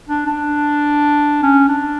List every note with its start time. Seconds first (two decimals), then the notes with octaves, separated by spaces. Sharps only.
0.09 D4
0.26 D4
1.43 C#4
1.68 D4